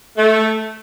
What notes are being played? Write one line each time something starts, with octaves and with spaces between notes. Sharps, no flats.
A3